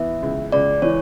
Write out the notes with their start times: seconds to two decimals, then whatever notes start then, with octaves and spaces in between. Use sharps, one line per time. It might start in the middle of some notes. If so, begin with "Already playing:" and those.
Already playing: E3 B3 E5
0.22 C#2
0.52 C#2 D5
0.82 E3 C#5